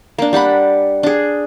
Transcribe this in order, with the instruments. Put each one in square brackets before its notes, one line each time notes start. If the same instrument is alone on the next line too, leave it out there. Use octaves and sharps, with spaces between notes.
[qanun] A#3 D4
G3 G4 F#5 B5
D4 G#4